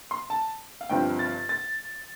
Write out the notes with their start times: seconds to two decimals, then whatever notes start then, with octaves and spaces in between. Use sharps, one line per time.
0.11 C6
0.30 A5
0.81 F5
0.89 G1 G2 F3 C4 G5
1.19 A6
1.49 A6